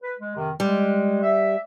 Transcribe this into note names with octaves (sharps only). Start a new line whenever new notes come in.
B4
G#3
F2 C3 D#3
G3 G#3
E5